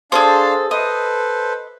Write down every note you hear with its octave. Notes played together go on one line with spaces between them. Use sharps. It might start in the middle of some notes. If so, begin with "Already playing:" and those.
D4 G#4 A4 C5 F5 A5
A4 B4 C5 D#5